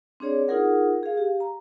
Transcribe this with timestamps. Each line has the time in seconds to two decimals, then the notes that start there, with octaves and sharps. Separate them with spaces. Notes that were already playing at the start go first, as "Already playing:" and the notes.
0.20 C4 D4 G#4 C#5 D5
0.48 D#4 F4 G#4 A#4 F#5
1.03 G#4 F5
1.17 G4
1.40 A#5